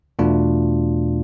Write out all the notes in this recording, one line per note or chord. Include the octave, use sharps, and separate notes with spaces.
E2 B2 A3 D4 F4